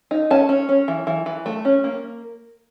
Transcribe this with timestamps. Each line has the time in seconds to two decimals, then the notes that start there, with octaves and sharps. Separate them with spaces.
0.11 D#4
0.30 C#4 A5
0.49 C#4
0.69 C#4
0.88 E3
1.07 E3
1.26 E3
1.46 A3
1.65 C#4
1.84 A#3